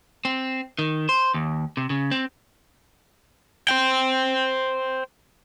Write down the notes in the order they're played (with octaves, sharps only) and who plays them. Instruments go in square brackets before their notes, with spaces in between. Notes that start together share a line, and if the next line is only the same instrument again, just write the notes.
[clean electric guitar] C4
D#3
C5
D#2
C3
C#3
C4
[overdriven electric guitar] C5 G5